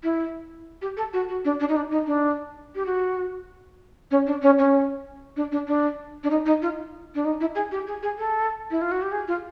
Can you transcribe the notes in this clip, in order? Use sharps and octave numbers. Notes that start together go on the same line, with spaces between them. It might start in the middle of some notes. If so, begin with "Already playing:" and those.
E4
G4
A4
F#4
F#4
D4
D4
D#4
D4
D#4
D4
G4
F#4
C#4
D4
C#4
C#4
D4
D4
D4
D4
D#4
D#4
F4
D4
D#4
E4
G#4
G4
G#4
G#4
A4
E4
F4
F#4
G4
G#4
F4